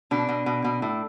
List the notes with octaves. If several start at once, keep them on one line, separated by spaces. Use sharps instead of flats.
B2 D4
B2
B2
B2
A2